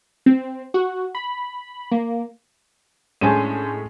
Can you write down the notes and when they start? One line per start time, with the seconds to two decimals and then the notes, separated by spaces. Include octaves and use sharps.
0.26 C4
0.74 F#4
1.15 B5
1.92 A#3
3.21 A2 G#3 A3 C#4 D4 C5 G#5 D#7